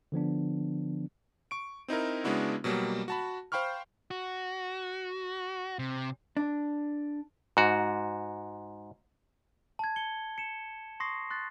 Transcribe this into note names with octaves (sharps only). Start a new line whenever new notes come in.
D3 F3 B3 D4
C#6 D7
C4 D#4 E4 A#4
C#3 G#3 B3 D4 E4 F#4
B2 F#3 G3 A#3
F#4 A5 B5
C5 F5 G5 B5 C#6 F6
F#4
C3
D4
G#2 F#4
A5 G#6
C#7 G7
C#7 E7
C6 C#6 D#6 A#6 C7
C6 F#6 A6